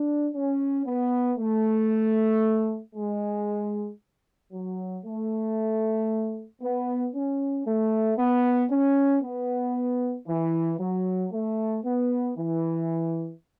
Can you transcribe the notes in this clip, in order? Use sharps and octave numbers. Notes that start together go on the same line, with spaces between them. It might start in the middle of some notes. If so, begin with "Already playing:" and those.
Already playing: D4
C#4
B3
A3
G#3
F#3
A3
B3
C#4
A3
B3
C#4
B3
E3
F#3
A3
B3
E3